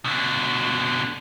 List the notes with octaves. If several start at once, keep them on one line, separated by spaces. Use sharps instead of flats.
B2 D3